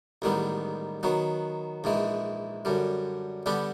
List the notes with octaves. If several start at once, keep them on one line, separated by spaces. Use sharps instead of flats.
A1 G#2 D#3 G3 B3
D#3 F#3 B3
A#1 G#2 E3 G#3
F#2 D3 G3
D3 G3 B3 D4 G4